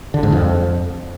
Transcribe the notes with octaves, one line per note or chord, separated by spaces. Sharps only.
D3
G#2
F2